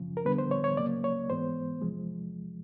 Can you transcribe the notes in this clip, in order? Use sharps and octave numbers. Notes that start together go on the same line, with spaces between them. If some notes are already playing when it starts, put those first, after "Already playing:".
Already playing: F#2 C#3 F3
A#4
F2 D3 G3 B3 B4
C5
C#5
C#5
C#2 C#3 F#3 A#3 D5
C#5
G#2 E3 G#3 B3 C5
E2 C3 F3 G#3